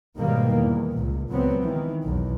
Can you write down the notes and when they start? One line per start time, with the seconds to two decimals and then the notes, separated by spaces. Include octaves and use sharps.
0.17 G#2 B2 D#3 G3 A#3
0.55 E2
0.94 C#2 A#2
1.29 C#2 F#3 B3 C4
1.64 D#3 E3
2.05 B1 E2